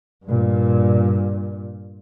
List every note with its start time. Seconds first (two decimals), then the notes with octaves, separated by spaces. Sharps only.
0.25 G2 A#2